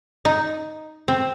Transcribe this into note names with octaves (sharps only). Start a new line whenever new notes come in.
D#4
C4